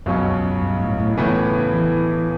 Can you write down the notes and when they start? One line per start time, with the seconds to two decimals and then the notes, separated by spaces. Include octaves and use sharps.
0.06 C#2 F#2 B2 F#3 C#4
0.62 G2
0.80 A2
1.00 A2
1.17 A2 C#3 E3 B3
1.73 E3